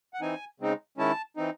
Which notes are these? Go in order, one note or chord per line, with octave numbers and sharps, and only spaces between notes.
F#5
E3 C4 D#4 G#5
C#3 G#3 C4 D#4
D#3 G#3 C#4 E4 A5
E3 C4 D#4